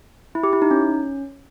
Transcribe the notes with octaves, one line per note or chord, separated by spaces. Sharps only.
E4
G4
E4
D#4
C#4